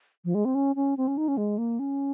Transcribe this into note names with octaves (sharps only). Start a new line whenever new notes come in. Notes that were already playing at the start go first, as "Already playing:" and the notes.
F3
G#3
C4
C#4
C#4
C4
C#4
D#4
C#4
G#3
A#3
C#4